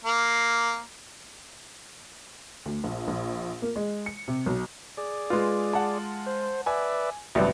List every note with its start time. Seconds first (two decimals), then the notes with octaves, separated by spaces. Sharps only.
0.05 A#3
2.66 D2
2.84 A#1
3.08 A#1
3.62 A#3
3.76 G#3
4.06 C#7
4.28 C3
4.46 B1
4.97 G#4 D5
5.30 G#3 F4 B4
5.73 F#5 A5
6.26 C5
6.66 B4 D5 E5 G#5
7.35 A1 G2 C3 F#3 B4 D5 E5